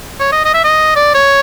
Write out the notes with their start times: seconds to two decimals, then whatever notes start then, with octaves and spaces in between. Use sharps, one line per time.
0.20 C#5
0.32 D#5
0.45 D#5
0.54 E5
0.64 D#5
0.96 D5
1.15 C#5